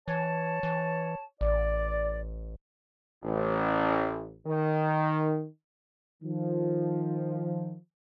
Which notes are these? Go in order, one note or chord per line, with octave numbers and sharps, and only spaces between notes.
E3 C#5 A5
E3
A1 D5
A1
D#3
D#3 F3